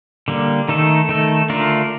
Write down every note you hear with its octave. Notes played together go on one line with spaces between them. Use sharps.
D3 G3 A#3
D#3 A3 D#4 A4
D#3 A3 D#4 A4
D3 A3 D4 F4 A#4